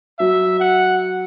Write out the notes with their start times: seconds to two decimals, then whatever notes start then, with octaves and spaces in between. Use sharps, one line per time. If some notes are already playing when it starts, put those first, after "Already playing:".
0.19 F#3 E5
0.60 F#5